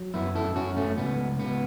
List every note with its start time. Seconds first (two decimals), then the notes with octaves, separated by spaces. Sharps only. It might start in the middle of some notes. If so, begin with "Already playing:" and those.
Already playing: F#3
0.14 F#2 B3 E4
0.35 E4 A4
0.55 F#2 C#4 F#4
0.77 A3 C#4
0.98 C#2 B3
1.39 C#2 B3